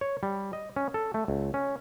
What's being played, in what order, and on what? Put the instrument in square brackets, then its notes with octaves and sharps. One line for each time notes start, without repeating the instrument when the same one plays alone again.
[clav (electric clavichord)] C#5
G3
D#5
C#4
A4
A3
C#2
C#4